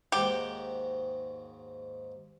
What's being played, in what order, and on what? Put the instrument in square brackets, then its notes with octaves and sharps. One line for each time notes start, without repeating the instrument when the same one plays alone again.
[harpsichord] D#2 G#2 F#4 [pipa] G4